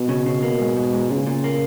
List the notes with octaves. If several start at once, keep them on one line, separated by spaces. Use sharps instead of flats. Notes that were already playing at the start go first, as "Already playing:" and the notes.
Already playing: B2
C#3
C#3
A#3
G#2
G#2
G#2
A#2 C#3
A#2
A#3